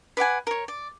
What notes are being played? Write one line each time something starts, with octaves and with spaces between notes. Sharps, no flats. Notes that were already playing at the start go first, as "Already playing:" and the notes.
B4 D5 F#5 G#5
A#4 C#5
D5